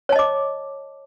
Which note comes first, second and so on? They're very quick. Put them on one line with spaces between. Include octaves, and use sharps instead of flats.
C#5 A5 D#5 D6